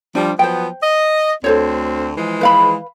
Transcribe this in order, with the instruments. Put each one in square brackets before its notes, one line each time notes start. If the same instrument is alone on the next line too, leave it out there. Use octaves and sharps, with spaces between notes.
[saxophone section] F3 G3 [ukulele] D4
[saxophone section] F3 F#3 B3 [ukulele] C5 G5
[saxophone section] D#5
[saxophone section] D2 C4 [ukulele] A4 C5 C#5
[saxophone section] E3 F3 G#3
[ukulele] B4 F5 B5